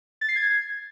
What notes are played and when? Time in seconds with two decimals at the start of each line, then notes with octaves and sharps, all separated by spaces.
0.21 A6
0.28 C7
0.36 G#6